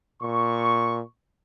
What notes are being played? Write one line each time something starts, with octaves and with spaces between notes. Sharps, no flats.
A#2 C#6